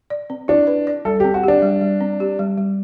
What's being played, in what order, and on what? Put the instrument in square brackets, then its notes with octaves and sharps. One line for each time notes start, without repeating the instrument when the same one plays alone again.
[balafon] D5
C4
[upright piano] D4 [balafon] E4
[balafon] B4
D5
[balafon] G3 [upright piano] A4
[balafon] C4 [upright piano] G4
[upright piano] F#4
[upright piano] D4 [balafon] G4
[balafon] G3
G3
C4
G4
G3
G3